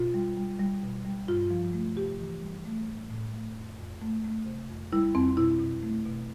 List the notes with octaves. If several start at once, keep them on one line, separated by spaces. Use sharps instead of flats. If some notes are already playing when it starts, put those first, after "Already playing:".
Already playing: B2 F4
G3
G3
G3
B2
G3
G2 F4
F3
A3
C3 G4
E3
G3
A3
A2
A2
A3
F2
F2
A3
A3
C3
F2
G3 E4
F2 C4
B2 E4
B2
A3
B2